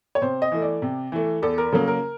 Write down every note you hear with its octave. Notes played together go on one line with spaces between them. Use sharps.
C#5
C3 C5
D#5
E3 A3
D5
C3
E3 A3
E2 A4
A#4
C#3 F#3 A#3 A4
A#4